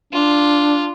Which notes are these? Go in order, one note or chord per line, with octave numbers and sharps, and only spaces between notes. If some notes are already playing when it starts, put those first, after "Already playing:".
D4 F4